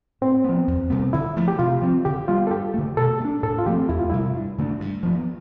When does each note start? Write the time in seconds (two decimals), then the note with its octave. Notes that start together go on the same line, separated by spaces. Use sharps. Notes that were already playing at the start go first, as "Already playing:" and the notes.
0.21 A2 C4
0.44 F3 B3
0.68 E2
0.90 C3 G3 B3
1.13 D3 E4
1.37 F3 A3
1.48 G4
1.59 C3 F4
1.82 F3 C4
2.05 D3 G4
2.28 G3 B3 F4
2.47 A4
2.51 G2 G4
2.74 D3 A3
2.97 B2 A4
3.20 A3
3.25 D4
3.43 A2 A4
3.58 F4
3.66 F3 A3 C4 G4
3.89 E2 E4
3.99 F4
4.10 C3 G3 E4
4.34 G2
4.58 D3 A3 D4
4.80 G2
5.03 F3 B3